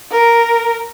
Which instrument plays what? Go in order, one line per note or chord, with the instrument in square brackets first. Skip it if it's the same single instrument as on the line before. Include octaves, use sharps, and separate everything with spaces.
[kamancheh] A#4